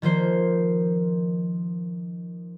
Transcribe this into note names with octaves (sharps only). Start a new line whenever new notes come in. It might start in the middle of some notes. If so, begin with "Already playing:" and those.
D#3 F3 A#3 C5